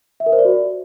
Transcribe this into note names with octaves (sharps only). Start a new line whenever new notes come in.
E5
A#4
C5
D5
F#4